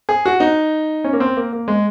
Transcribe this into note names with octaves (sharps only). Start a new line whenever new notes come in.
G#4
F#4
D#4
C#4
A#3
C4
A#3
A#3
G#3